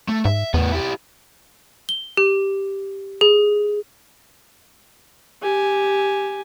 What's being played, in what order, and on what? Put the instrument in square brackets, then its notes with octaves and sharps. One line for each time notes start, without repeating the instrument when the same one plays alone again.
[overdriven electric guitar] A3
[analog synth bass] G#2 [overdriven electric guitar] E5
[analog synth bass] E2 [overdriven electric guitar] A2 B3
[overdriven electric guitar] E4 G4
[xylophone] G7
G4
G#4
[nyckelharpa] G4 G#5